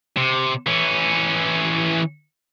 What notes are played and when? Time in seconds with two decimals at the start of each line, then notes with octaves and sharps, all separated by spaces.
0.17 C3
0.67 E3 C#4